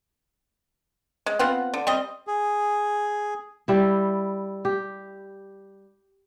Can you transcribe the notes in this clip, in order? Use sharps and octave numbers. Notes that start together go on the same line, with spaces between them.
G#3
B3 C4 F4 F#5
D3
G3 C4 D#5
G#4
G3 E4
G4